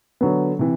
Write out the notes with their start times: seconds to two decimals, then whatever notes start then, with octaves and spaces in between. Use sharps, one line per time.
0.21 D3 F#3 B3
0.59 C3 E3